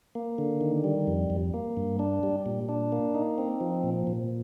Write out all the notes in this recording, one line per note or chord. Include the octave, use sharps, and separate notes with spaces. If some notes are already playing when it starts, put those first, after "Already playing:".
A#3
D3
D#3
G3
F2
F2
A#3
G2
D4
G3
A#2
D4
A#3
D#4
C4
F3
A#2
A#2